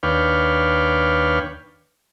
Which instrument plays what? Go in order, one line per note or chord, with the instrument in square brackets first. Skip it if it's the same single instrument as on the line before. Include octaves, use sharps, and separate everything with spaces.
[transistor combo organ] D#2 D4 B4 C#5 F5 G5